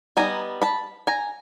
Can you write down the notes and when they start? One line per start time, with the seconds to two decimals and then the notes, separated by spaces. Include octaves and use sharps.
0.17 G3 B3 D#4 G#5 A#5
0.62 A5 B5
1.07 G#5 A#5